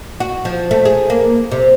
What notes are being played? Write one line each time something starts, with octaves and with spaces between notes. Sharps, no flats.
F#4
F3
A3
G#4
A#3
C3